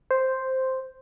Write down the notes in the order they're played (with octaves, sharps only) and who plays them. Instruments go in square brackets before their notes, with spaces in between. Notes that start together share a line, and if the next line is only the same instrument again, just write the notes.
[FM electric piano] C5